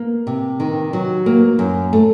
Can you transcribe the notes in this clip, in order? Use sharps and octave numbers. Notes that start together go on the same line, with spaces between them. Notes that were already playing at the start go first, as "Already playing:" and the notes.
Already playing: A#3
C3
D#3
F#3
A#3
F#2
A3